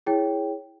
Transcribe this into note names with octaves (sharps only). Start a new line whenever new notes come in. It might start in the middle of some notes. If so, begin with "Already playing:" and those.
E4 G#4 C#5 G5